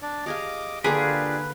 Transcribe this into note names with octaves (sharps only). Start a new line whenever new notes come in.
D4 D5
G4 G#4 D#5 F5 D6
D3 A#3 D4 F4 G4 G#4 B4 C6